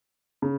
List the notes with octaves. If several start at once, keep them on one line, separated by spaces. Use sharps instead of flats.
C#3